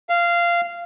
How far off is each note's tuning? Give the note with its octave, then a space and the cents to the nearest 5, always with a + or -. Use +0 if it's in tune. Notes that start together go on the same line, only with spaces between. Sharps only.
F5 -15